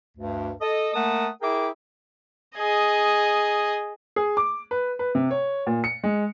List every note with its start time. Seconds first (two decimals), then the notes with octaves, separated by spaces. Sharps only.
0.17 D2 G2
0.61 A4 D#5
0.94 A3 A#3 A#4 F#5 A5 D#6
1.41 E4 G#4 A#4 E5 G5 D6
2.57 G#4 D#5
4.16 G#4
4.37 D6
4.71 B4
4.99 B4
5.15 C3
5.31 C#5
5.67 A#2
5.84 C#7
6.04 G#3